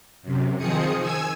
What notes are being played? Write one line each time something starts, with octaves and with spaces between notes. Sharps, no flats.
F#2 C3
D#3 F3 C4 G#4 D#6 C#7
G#5 E6 G#6